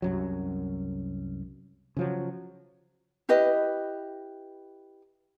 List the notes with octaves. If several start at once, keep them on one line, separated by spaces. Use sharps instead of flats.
C2 F#2 F#3
C#3 F3 F#3
E4 G4 B4 D#5